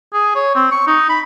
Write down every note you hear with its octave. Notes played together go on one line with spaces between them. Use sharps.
G#4
C#5
C4
C#6
D#4
B5